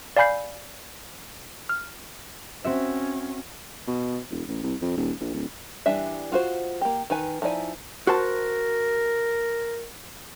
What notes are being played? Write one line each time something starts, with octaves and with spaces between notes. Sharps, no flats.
D5 F5 G#5 B5 G6 C7
F6
C4 C#4 F#4 E5
B2
E1
A1
C2
F2
D#1
A#1
D1
E3 G3 D4 E5
F4 F#4 G#4 C5
A#3 G4
D#3 B4 G#5
F3 D#4 E4 D5 G#5
F#4 A#4 C5 A5